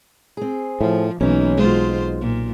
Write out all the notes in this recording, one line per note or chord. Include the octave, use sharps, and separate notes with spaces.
C4 G#4
A2 F3
B1 E3 A#3 C#4 D#4
B2 G#3 F4 C5
A#2